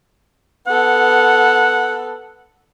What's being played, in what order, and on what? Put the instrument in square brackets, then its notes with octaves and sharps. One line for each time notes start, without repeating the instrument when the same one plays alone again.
[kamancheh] B3 A4 [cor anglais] F#5